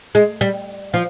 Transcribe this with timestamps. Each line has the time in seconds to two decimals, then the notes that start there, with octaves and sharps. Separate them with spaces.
0.15 G#3
0.41 G3
0.94 F3